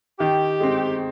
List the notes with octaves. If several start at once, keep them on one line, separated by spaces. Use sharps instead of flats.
D#3 G4
G#3 C4